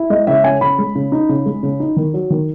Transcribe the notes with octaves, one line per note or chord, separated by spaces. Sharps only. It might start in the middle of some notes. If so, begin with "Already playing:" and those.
Already playing: E4
G#3 D#5
C#3 E5
C#4 G#5
C#3 B5
G#3
C#3
D#4
C#3
G#3
C#3
D#4
D#3
F#3
D#3